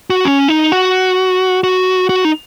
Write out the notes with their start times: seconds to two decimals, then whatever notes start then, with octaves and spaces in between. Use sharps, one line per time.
0.10 F#4
0.25 C#4
0.48 D#4
0.72 F#4
1.64 F#4
2.09 F#4
2.25 D#4